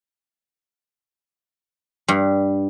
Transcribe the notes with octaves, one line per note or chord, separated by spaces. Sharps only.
G2